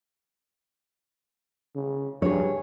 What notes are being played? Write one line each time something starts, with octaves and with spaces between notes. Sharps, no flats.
C#3
G2 G#4 C#5